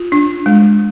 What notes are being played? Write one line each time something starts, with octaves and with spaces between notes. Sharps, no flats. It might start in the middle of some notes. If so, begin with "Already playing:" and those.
Already playing: F4
D4
G#3